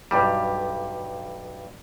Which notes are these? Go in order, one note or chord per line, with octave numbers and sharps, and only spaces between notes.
B1 G2 G3